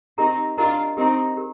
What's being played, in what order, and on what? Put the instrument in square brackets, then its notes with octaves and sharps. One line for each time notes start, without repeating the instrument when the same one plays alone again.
[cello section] C4 D#4 [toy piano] G4 A#4 D#5 A#5
[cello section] D4 F4 [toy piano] G4 A#4 D#5 A#5
[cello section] C4 D#4 [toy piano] G4 A#4 D#5 A#5
[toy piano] G4 A#4